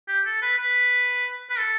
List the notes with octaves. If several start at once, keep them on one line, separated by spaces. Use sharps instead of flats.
G4
A4
B4
B4
B4
A4